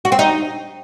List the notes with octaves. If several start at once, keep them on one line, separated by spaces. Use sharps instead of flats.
F#4
C4
D#4